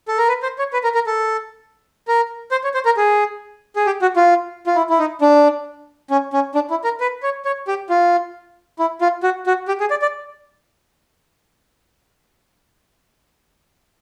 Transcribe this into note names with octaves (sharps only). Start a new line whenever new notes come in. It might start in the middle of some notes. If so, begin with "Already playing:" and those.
A4
A#4
B4
C5
C#5
B4
A#4
A#4
A4
A#4
C5
C#5
C5
A#4
G#4
G#4
G4
F#4
F4
F4
E4
E4
D#4
D4
C#4
C#4
D4
E4
A#4
B4
C#5
C#5
G4
F4
E4
F4
F#4
F#4
G4
G#4
D5
D5